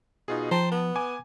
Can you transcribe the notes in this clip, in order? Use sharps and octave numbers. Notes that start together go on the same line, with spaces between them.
B2 D#4 F4 G#4
F3 C5 G5 A5 A#5
B3
G#5 D6